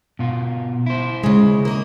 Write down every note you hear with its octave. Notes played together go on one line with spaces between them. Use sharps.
B2 F4
E4 C5
C#3 G#3
A#3 D#5